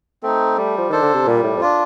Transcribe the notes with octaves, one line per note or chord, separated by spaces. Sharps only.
A3 C4 D#4
G3 A3
F3
D#3 D4 A4 C5
D3
C3
A#2 G3
A2
F2
D4 F4